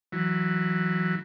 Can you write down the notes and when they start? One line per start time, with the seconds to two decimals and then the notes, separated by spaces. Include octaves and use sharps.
0.12 E3 F#3